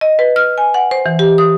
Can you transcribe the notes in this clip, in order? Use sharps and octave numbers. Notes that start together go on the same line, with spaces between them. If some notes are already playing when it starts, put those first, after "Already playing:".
D#5
B4
F6
G#5
F#5
C5
E3
G4
D#6